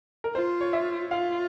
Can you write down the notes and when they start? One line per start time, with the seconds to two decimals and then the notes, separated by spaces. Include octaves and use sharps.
0.24 A#4
0.35 F4 C5
0.61 C#5
0.73 E5
1.11 F4 F5